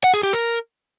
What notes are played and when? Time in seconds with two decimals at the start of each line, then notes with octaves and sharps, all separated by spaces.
0.04 F#5
0.14 G#4
0.23 G4
0.33 A#4